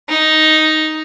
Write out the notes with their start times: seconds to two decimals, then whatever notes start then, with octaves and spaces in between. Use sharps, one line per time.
0.09 D#4